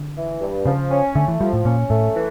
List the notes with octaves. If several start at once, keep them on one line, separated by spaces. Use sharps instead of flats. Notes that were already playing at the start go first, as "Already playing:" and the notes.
Already playing: D3
E3
G2
C#3 F3
C#4
D3 A3
E3
F3 G3
A2
A#2 C#4
A2 A3
E3